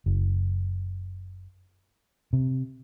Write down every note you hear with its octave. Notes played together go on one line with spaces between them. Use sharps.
F#1
C3